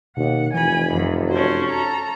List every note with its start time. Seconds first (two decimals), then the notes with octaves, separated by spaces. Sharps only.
0.17 D#2 B2 F#5
0.54 F1 E3 G#5 B5
0.94 F#2
1.31 C#4 D4 F#4 C5
1.69 A4 A#5